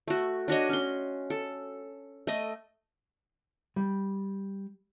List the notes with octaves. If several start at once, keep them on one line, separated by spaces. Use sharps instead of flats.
A3 F#4
D4 F#4 C#5 D#5
C#4 C6
A4
A3 D#5
G3